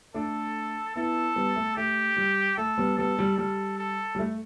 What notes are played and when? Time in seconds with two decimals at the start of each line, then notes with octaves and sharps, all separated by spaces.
0.14 A3 D4 A4
0.96 B3 E4 A4
1.36 G3 B3
1.56 A3
1.76 A3 G4
2.17 G3
2.57 A3 A4
2.78 G3 B3
2.98 G3 B3 A4
3.19 G3
3.38 G3 A4
3.79 A4
4.15 G3
4.19 A3